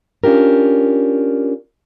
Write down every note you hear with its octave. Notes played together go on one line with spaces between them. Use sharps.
C#4 D4 F4 G4 A#4